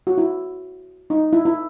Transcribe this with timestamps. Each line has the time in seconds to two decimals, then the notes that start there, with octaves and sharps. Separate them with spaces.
0.07 F#4
0.18 E4
1.10 D#4
1.33 E4
1.45 E4